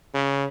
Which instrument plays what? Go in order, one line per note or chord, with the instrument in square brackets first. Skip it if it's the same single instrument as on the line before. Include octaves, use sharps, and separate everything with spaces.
[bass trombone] C#3